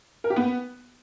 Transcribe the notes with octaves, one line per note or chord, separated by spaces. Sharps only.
A#4
G4
B3